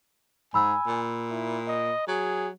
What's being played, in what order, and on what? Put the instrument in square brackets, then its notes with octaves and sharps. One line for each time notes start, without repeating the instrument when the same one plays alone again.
[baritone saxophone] G#2 [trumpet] G#5 [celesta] B5 E6
[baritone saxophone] A#2
[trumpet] E4
D#5
[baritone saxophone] F#3 [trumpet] G#4